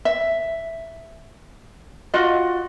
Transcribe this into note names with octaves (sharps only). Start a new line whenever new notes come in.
E5
F4 F#4 D#5